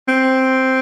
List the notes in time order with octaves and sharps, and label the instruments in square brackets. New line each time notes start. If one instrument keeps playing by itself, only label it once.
[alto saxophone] C4